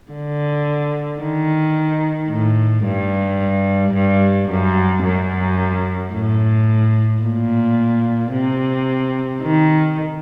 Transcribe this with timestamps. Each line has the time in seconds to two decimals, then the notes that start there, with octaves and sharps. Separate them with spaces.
0.12 D3
1.21 D#3
2.30 A2
2.85 G2
3.94 G2
4.50 F#2
5.05 F#2
6.13 A2
7.23 A#2
8.32 C3
9.42 D#3